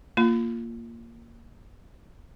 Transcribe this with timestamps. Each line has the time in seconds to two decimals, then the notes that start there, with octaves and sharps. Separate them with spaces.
0.17 A#3 F4